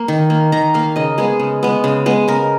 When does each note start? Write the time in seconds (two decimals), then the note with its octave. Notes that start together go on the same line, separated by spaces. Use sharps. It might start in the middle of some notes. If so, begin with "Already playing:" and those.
Already playing: A#3
0.08 D#3
0.30 A#3
0.52 D#3 A#5
0.74 A#3 F5
0.96 C#3 D#5
1.18 G#3 B3 G#4
1.40 C#3
1.63 G#3 B3
1.84 C#3
2.06 G#3 B3
2.28 C#3 A#4